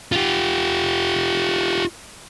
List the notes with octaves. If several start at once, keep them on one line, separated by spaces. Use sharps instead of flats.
F4 G4